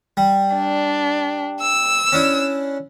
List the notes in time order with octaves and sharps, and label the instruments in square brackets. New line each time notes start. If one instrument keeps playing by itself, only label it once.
[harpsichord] G3
[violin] D4
E6
[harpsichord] C#4 D4 E4